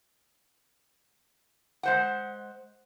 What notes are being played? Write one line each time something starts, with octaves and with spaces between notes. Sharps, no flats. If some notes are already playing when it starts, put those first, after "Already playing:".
G#3 C5 F#5